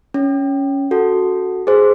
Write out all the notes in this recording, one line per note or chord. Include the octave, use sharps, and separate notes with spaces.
C#4
F#4 A4
G#4 C5